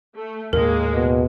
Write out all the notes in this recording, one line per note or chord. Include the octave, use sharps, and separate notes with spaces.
A3
D#2 A2 G#3 A#3 A#4
B2